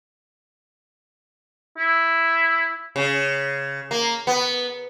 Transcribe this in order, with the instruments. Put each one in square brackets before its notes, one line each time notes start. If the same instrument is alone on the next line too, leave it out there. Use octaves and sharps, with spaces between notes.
[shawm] E4
[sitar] C#3
A#3
B3